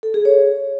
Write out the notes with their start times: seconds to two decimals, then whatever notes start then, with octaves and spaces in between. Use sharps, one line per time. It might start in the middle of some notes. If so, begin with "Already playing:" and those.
0.03 A4
0.14 G#4
0.25 C#5